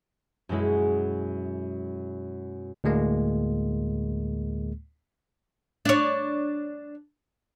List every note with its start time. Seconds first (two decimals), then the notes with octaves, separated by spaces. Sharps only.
0.49 F#2 B2 G#3 E4
2.84 D2 A2 G#3 A#3
5.85 D4 C#5